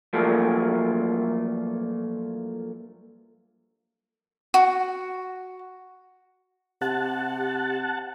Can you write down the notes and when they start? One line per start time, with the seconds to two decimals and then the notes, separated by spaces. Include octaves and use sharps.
0.13 G2 F3 F#3 A3 A#3
4.54 F#4
6.82 C3 G4 F#5 A5